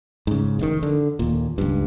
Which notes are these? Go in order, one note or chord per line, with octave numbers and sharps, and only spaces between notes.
G#2 C#3
F1 B2 D#3
D3
D#2 A#2
C#2 G2